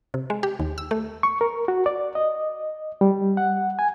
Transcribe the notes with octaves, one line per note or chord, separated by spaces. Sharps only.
C3
G#3
G4
D#2
E6
A3
C#6
A#4
F#4
D5
D#5
G3
F#5
G#5